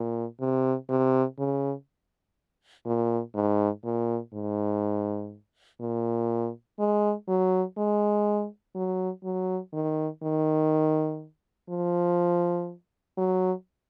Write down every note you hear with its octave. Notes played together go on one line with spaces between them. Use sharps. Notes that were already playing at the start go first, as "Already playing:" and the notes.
Already playing: A#2
C3
C3
C#3
A#2
G#2
A#2
G#2
A#2
G#3
F#3
G#3
F#3
F#3
D#3
D#3
F3
F#3